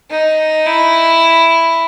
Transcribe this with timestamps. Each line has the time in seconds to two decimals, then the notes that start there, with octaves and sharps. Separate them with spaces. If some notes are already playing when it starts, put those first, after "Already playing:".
0.11 D#4
0.67 E4